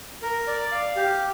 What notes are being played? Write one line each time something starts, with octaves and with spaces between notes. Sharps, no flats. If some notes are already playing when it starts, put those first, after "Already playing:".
A#4
D5
F5
G4